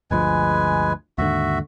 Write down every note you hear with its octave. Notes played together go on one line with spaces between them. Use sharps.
G1 D2 F3 G#3 B4 G#5
D#2 G#2 D3 F#4 E5